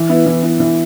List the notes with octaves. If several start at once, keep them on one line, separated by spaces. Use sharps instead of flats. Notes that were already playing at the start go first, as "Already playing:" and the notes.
Already playing: E3
B3 E4
E3
B3 E4
E3